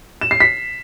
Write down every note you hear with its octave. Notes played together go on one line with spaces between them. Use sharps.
E7
C7
B6